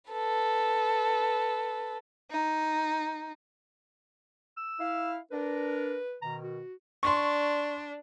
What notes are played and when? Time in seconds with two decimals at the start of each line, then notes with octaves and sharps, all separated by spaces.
0.11 A4 B4
2.30 D#4
4.57 E6
4.80 E4 F5
5.31 D4 A#4 B4
6.22 B2 D#3 A#5
6.44 F#4
7.03 D4 C6 C#6